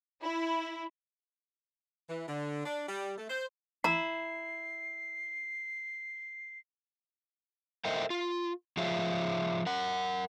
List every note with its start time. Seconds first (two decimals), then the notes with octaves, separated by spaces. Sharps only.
0.23 E4
2.09 E3
2.28 D3
2.65 D4
2.88 G3
3.18 A3
3.30 C5
3.84 E4 A#5 C7
7.85 A4 A#4 C5 D#5 E5 G5
8.10 F4
8.77 F3 F4 G#4 C#5 E5 F5
9.66 A#4 F#5